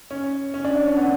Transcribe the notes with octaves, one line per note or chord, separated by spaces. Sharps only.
C#4
C#4
D4
D4
C#4
B3